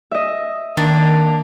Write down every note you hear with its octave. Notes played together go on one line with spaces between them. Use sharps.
D#5 E5
D#3 A#3 D4